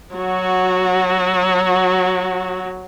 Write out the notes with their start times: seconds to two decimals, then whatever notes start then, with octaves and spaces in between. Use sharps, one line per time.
0.15 F#3 F#4